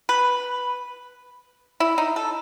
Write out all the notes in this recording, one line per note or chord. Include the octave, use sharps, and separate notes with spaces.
B4
E4
D#4
A4